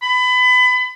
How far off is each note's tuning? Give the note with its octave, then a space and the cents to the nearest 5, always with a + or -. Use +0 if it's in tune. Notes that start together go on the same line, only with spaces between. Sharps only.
B5 +25